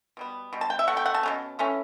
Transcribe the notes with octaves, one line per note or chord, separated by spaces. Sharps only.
B2 G3 B3
B2 G3
A5
G5
E5
B2 A3 F#5
G5
F#5
A5
B2 A3 C#4
E3 A3 C#4